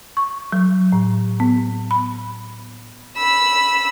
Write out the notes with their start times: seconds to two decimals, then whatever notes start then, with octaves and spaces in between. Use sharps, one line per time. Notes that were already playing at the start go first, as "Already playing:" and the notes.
0.17 C#6
0.52 F#3
0.92 A2
1.40 B3
1.91 B5
3.17 B5 E6